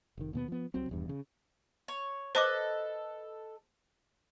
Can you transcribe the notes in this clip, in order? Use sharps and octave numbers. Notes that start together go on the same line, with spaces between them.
F1 D#3
D#2 B2 B3
F3 B3
C2 C3 F#3 C4
D#1 E2 G2
C#3
C#5
A4 B4 C5 D#5 D6